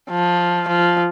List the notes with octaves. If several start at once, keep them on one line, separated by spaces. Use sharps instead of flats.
F3
F3